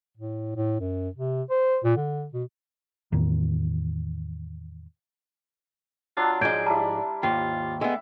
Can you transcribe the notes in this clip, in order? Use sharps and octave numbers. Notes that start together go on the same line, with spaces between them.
A2
A2
F#2
C3
C5
A#2
D3
B2
E2 A2 D#3
F#3 D4 F4
G#2 F3 G#3 D5 G6 G#6 D7
G3 E4 A5 A#5
D#2 G#2 F4 G5
D3 G#3 B3 E5